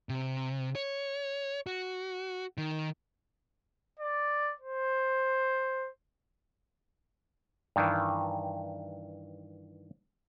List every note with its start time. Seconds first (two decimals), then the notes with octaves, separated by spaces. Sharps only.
0.09 C3
0.75 C#5
1.67 F#4
2.58 D#3
4.00 D5
4.60 C5
7.76 G2 D#3 E3